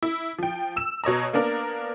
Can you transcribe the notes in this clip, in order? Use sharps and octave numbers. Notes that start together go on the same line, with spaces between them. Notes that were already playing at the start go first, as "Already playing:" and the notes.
E4
F3 G5
E6 E7
B2 C#5 D#5 A#5
A#3 B3 D4 A#4